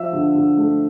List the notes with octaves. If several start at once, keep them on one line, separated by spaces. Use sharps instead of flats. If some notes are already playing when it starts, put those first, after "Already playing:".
Already playing: F3 E5 E6
D3
D3
A3